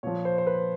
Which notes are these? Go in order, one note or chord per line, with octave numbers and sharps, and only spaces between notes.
A#2 F3 C#5
C5
C5
B4